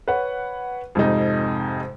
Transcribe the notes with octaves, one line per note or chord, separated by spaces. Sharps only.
B4 C#5 F#5
F2 G#2 C3 D#4